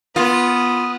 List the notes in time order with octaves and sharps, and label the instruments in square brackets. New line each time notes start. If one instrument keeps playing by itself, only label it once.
[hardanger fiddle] B3 [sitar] F4 [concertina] D#6